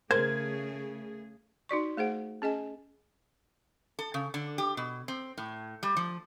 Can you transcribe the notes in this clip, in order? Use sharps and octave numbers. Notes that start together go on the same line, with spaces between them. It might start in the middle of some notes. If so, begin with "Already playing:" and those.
C#3 A3 G#4 A#4 C5 G#6
D#4 F#4 D5 C#6
A3 G#4 C5 F#5
C#4 G#4 D#5 G#5
A4
C#3
D3
G4
B2
C4
A2
G3
F3